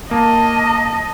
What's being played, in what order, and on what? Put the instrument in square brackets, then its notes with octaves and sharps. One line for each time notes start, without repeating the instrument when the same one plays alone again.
[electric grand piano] A#3 [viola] D#5 [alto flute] A5